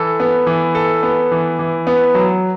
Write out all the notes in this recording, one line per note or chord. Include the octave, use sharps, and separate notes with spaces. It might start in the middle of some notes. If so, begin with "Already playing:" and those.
Already playing: E3 A4
B3
E3
A4
B3
E3
E3
B3
F#3